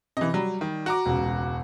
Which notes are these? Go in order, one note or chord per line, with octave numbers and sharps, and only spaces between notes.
C3 E3 D#5
F#3 G3
D#3
F#4 A#5 D6
E1 C#2